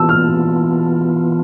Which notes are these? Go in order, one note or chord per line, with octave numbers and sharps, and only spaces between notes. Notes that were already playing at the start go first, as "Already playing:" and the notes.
Already playing: E3 B3 F4 A5 E6
F6